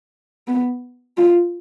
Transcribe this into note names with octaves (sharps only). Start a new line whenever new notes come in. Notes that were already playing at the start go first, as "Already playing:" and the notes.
B3
F4